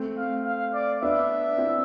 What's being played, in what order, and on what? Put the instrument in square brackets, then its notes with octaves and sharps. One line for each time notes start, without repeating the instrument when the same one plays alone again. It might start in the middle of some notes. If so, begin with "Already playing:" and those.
Already playing: [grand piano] A3 C4
[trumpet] F5
F5
D5
[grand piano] B3 D4 [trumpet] E5
[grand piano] C4 E4